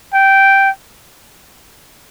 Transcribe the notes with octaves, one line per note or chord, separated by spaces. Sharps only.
G5